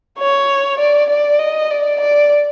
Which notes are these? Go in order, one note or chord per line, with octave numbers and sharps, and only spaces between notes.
C#5
D5
D5
D#5
D5
D5